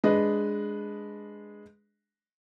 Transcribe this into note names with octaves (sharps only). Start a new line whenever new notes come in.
G#3 D4 B4 D#5